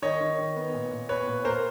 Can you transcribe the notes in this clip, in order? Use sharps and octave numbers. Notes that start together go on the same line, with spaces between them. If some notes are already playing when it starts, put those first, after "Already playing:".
D#3 C#5 D#5
D#3
D#3
B3
A#2
A#2
B3 B4 C#5
A#2
A#2 A#4 C5